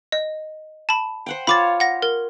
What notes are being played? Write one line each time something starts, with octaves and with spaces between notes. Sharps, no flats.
D#5
A5 B5
C5 F#5 G5
F4 C5 C#5 B5 D6 A6
F#5 A#6
A#4